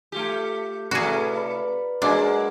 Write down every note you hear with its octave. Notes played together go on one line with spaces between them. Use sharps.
A3 F4 G4
A2 C3 A3 F#4 G#4 B4 D5 A#5
B4 F5
F#3 G#3 A#3 D4